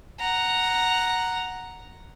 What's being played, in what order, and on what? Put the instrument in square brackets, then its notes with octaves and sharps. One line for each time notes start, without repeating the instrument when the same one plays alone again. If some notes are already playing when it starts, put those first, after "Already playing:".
[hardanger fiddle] F#5 A#5